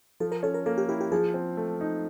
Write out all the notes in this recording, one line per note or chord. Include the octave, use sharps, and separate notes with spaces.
F3 A4
A#4
C#4 A4
A#4
A#3 A4
G4
E4 G4
G4
F3 G#4
C4
A3
D#4